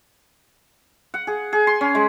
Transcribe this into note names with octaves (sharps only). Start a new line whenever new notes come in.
F#5
G#4
G#4
C6
C#4
G#3